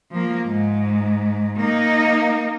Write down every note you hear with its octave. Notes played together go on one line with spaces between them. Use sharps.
F3 A#3
G#2
A#3 D#4